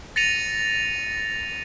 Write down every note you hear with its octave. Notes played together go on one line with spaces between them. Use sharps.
A6 A#6 C#7 D#7 F7